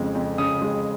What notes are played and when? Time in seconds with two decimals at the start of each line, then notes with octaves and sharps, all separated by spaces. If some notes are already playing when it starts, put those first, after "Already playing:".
Already playing: F2 C#3 G#3
0.15 F2
0.38 C#3 D#6
0.62 G#3